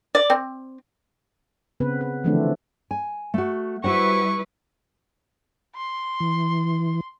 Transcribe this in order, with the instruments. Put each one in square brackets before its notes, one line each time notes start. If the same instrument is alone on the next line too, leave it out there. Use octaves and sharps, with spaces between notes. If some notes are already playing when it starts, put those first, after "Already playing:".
[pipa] D5
C4
[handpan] C#3 B3 C4 B4
B4
D3 E3 F3 A3 C4 D4
[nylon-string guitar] G#5
A3 F#4
[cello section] G3 E4 B4 [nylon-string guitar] F#4 C5 F#5 [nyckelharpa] C#6
[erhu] C6
[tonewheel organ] E3